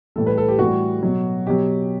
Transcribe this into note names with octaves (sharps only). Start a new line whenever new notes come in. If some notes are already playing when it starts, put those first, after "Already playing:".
A2 E3 G3 A4
B4
A4
G4
A2 E3 G3 F#4
B2 F#3
B2 F#3 G4